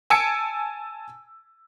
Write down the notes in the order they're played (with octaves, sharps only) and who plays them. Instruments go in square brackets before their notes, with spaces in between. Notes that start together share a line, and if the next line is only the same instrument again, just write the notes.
[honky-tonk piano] G#5 A5 E6 G#6 C#7 D7